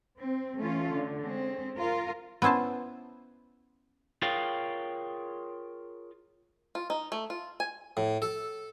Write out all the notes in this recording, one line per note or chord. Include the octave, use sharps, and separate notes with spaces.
C4
E3 A3 C#4 F4
D3
G#3 C4 C#4
F4 A#4
B3 C#4 E4 C5 A5
F4 G#4 A#4 C#5 F5 G5
F4
D#4
A3
F4
G#5
A2
A4